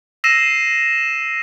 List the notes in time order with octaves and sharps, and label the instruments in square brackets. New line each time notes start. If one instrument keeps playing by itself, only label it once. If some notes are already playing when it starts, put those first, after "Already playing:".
[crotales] E6 A#6 C7 D#7 E7